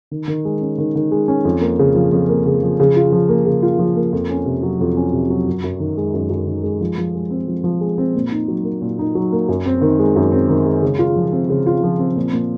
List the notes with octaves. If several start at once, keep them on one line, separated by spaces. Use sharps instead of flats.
D#3
D#3
G#3
C#4
D#3
D#3
G#3
C#4
F2
A#3
C#3
F3
F2
A#3
C#3
F3
C#3
F4
F3
A#3
C#3
F4
F3
A#3
F2
C#4
C3
F#3
F2
C#4
C3
F#3
F#2
F#2
D#3
G#3
F#2
F#2
D#3
G#3
F3
F3
G#3
C4
F3
F3
G#3
C4
A#2
D#4
F#3
A#3
A#2
D#4
F#3
A#3
F#2
C4
D#3
G#3
F#2
C4
D#3
G#3
C#3
F4
F3
C4
C#3
F4
F3
C4
A#2
A#2